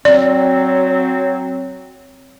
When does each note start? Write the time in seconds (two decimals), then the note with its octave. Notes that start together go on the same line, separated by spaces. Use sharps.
0.05 F#3 C4 D5